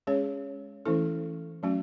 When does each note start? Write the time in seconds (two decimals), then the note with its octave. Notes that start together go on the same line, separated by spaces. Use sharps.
0.07 G#3 C#4 G#4 C#5
0.86 E3 A3 C#4 E4 A4
1.63 F#3 A3 C#4 F#4